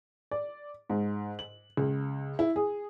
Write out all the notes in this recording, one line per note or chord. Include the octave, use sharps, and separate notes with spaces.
D5
G#2
F#7
C#2
E4
G#4